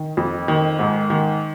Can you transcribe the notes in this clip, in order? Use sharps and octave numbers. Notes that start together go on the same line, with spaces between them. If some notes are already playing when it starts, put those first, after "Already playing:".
Already playing: D#3
F2
D#3
G#2
D#3